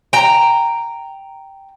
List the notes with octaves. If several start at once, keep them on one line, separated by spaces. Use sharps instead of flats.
G5 A#5